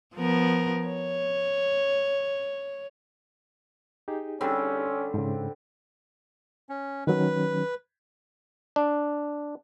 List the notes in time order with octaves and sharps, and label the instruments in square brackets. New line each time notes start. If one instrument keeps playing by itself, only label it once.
[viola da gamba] F3 B3 A#4
C#5
[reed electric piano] D#4 G4 G#4
[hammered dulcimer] D3 G3 C4 [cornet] C#4
[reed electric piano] G#2 C#3
[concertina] C#4
[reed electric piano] D#3 F#3 C#4 [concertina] B4
[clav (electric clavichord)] D4